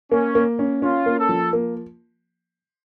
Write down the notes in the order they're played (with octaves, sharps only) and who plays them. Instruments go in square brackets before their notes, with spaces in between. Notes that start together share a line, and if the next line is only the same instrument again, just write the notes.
[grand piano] A#3 [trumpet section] C#4
[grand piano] A#3
C#4
[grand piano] C#4 [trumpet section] F4
[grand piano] A#3
[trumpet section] A4
[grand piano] F3
A#3